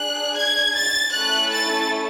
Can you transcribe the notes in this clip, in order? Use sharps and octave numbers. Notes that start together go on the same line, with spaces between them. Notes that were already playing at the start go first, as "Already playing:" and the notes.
Already playing: D4 G#4 F#6
G#6
A6
A3 C#4 E4 A4 F#6
A6